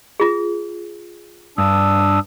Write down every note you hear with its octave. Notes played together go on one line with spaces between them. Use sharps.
F4 G#4
G2 D4 D#6 E6